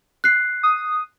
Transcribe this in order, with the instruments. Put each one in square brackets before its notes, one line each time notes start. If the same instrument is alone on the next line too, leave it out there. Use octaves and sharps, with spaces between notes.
[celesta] F#6 C7
[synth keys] D#6